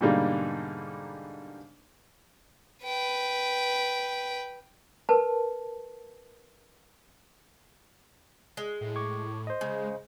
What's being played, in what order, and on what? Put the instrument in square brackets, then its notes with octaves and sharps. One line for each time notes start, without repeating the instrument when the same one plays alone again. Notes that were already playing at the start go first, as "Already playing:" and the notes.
[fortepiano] G#2 B2 D3 G3 A#3 D#4
[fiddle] B4 G5
[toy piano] A#4 B4 A5
[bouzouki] G#3
[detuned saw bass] A2
[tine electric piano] C#6 D6 G#6
C5 D#5
[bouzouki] C#3 [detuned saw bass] G#3